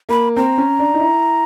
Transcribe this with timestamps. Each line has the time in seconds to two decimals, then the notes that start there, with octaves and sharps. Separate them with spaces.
0.09 A#3 B5
0.36 C4 A#5
0.58 C#4
0.79 D4
0.94 D#4
1.00 E4